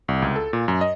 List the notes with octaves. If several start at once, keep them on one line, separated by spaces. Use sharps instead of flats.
C2
C#2
A4
A#2
F#2
D#5